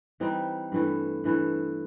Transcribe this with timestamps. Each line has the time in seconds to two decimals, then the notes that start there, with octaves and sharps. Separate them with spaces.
0.20 E3 G3 C4 D#4
0.72 G2 E3 A3
1.24 G2 E3 A3